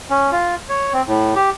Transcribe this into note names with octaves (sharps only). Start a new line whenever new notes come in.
C#4
F4
C#5
C4
A2
G4